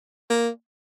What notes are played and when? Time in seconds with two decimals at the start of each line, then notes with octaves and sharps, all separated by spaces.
0.30 A#3